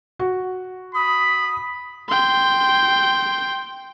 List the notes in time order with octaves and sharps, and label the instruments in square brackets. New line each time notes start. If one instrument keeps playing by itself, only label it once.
[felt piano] F#4
[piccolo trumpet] B5 [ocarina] D#6
[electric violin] G5 C6